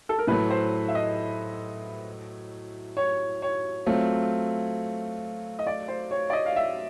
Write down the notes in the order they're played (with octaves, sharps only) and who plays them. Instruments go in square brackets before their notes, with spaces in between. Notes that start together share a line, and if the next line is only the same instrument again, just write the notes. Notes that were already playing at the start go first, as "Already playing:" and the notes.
[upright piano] A4
A#4
[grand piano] A2 F#3 A3 [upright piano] B4
[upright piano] C5
E5
D#5
C#5
C#5
[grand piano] F#3 A3 C4 F4
[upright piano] D#5
D5
C5
C#5
D5
D#5
F5
E5